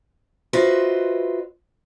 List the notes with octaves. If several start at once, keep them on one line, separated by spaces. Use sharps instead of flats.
F4 F#4 B4 C5 D#5 E5